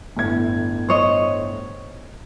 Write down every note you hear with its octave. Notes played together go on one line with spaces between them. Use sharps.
G1 A2 G#6
C5 C#5 D#5